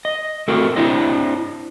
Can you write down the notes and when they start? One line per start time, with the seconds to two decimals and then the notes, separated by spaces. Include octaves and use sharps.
0.05 D#5
0.48 A3 C4 F#4 A#4
0.76 C4 D4 E4 C5 D#5